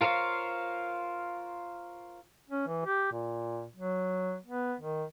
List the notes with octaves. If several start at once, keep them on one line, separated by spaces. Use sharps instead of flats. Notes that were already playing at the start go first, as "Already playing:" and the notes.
F4 A#4 C5 C#5 F5
C#4
E3
G4
A#2
F#3
B3
D#3